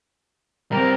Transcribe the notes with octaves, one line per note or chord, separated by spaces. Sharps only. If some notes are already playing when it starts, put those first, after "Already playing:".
G3 C4 A#4